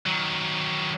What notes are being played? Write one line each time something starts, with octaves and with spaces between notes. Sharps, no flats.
D#3 F#3